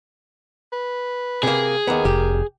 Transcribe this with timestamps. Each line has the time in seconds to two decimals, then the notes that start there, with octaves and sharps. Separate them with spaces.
0.72 B4
1.43 C3 A#3 G#4
1.87 D#2 B3 A#4
2.05 F1 G4